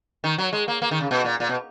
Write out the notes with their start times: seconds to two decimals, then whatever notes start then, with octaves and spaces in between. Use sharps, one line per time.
0.24 D#3
0.38 F#3
0.53 G#3
0.68 A#3
0.82 A#3
0.91 D#3
1.00 C#3
1.11 B2
1.24 A#2
1.40 A#2
1.49 B2